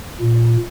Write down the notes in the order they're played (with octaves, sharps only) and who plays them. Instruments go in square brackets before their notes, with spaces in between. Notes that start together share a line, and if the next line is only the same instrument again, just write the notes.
[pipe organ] A#2